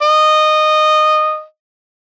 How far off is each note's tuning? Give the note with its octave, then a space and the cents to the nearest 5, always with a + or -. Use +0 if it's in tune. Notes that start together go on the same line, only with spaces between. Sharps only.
D#5 -15